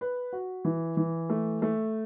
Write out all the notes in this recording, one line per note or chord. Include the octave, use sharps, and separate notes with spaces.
B4
F#4
E3
E3
A3
A3